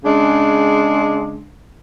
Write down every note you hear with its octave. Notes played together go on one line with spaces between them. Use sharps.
C#3 G#3 D4